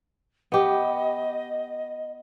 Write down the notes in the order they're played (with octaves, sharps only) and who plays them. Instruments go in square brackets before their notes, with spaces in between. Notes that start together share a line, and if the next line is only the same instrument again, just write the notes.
[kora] B3 G4 [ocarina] D#5